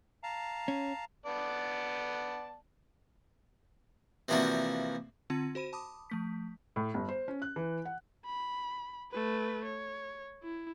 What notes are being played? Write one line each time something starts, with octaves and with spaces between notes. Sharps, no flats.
F5 A5 A#5
C#4
B3 D5 A5
C3 E3 F3 A#3 D4 F#4
D3 C4 F4 A5 G#6 C#7
F#4 C5 B5 D#7
A5 B5 D6 D#6
F3 A3 B6
A2
G1
C5
C#4
F#6
E3
F#5
B5
A3 B4
C#5
E4